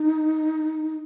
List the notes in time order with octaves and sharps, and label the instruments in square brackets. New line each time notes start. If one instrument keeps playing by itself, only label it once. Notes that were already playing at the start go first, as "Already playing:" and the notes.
Already playing: [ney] D#4